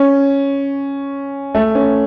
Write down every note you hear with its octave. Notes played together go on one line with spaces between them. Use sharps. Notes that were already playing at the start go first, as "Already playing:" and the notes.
Already playing: C#4
A3
C#4